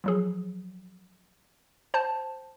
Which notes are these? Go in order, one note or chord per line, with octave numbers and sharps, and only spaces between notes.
F3 F#3 G#4
C5 G5 A5